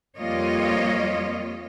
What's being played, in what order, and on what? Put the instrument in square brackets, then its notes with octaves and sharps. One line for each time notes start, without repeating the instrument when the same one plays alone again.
[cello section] F2 G3 A#3 F4 C#5 D#5